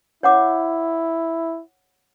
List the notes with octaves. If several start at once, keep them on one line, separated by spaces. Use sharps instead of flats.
E4 C#5 F#5 D6